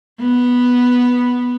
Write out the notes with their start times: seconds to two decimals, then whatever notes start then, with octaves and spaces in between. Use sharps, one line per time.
0.20 B3